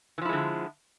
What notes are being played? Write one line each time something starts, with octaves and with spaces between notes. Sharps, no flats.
D3 E3 F3 G#3 E4